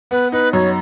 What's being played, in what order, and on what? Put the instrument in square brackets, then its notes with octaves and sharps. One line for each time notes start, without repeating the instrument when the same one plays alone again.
[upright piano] B3 [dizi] B4
[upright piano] D#4 [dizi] B4
[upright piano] F#2 [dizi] C#5